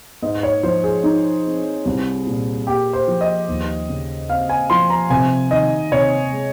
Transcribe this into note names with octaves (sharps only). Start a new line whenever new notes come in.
G#2 D#5
C#5
F3 C5
G#4
D#4
C4
C2
A#2
A#3 G4
C5
F3
D#5
D#2
C#3
C4 F5
G#5
F3 C6
A#5
C3 G#5
D#3 D#5
C3 C#5
G#3